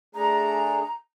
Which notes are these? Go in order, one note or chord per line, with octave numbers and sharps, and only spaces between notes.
A3 D4 G#4 A#5